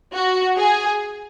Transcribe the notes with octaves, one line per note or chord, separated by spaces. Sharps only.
F#4
G#4